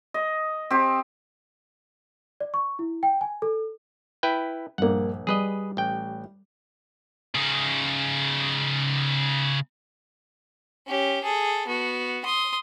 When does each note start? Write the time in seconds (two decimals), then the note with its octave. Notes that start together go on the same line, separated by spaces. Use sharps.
0.14 D#5
0.71 C4 G4
2.40 D5
2.54 C#6
2.79 E4
3.03 G5
3.21 G#5
3.42 A4
4.23 E4 B4 G5
4.78 A#1 G2 A#3 F#5
5.27 G3 G#4 B4 D#5
5.77 A1 G5
7.35 C#3 D#4
10.86 C#4 G4
11.23 G#4 A4
11.67 B3 F#4
12.25 C6 D#6